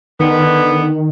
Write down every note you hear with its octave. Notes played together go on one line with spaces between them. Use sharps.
D3 D#3 B3